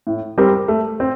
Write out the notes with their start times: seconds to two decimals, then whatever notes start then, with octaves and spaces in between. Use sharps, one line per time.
0.07 A2
0.38 G3 C4 G4 A#4
0.68 A3
1.00 C4